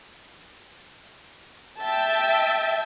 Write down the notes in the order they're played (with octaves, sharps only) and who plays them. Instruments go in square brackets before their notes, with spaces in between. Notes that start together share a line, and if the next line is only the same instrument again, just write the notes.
[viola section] E5 G5 A5